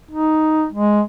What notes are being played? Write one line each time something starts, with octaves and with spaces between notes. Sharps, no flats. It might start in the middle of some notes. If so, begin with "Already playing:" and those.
D#4
G#3